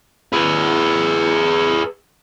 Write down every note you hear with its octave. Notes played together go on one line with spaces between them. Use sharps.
G#4 B4